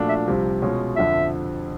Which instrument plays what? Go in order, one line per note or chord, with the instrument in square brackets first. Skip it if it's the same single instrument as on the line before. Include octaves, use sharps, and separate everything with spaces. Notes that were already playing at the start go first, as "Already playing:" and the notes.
Already playing: [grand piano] A#2 F3 A3 D4 F#4
[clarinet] E5
[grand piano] C2 C3 F3
B2 G#3 C#4 F4
[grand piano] F2 D3 F3 [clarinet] E5